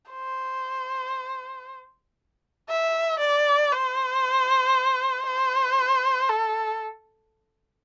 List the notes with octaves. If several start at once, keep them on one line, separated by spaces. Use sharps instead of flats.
C5
E5
D5
C5
C5
A4